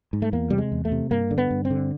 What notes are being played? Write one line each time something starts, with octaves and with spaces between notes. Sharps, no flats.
G#2
A3
E2 A#3
C3 G3
G#3
E2
A3
C3
G2 A#3
D3
B3
G2
C4
D3